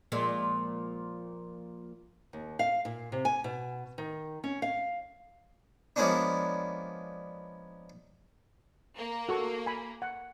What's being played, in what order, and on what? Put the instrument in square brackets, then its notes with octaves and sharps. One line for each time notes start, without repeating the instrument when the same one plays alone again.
[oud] A#2 F3 G#3
[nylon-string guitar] D#2
F5
A#2
C3
G#5
B2
D#3
C#4
F5
[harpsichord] F3 G#3 A#3 B3 C#4 D4
[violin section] A#3
[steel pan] F#4 A4 C#6
G#5 B5
F#5